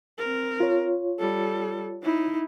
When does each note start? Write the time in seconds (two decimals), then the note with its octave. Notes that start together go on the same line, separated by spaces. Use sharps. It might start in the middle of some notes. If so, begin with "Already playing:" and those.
0.19 C4 A#4
0.60 F4 C#5
1.20 G3 A4
2.02 D#4 E4